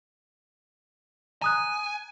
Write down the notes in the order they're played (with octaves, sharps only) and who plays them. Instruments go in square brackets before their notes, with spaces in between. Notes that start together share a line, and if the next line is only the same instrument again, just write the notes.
[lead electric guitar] G#5 [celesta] A#5 D#6 F#6